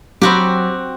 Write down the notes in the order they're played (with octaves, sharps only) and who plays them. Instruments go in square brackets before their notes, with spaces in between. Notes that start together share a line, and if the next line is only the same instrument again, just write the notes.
[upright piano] F#3 B5 [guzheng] C4 F#4 G4